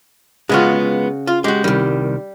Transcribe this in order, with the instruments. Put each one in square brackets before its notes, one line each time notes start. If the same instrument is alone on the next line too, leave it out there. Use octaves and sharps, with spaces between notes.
[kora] C#3 F#4 [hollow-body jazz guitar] G#3 B3 F4
[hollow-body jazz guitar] F4
[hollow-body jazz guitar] G#3 F#4 [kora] G4
[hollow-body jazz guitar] C2 D#3 [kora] G3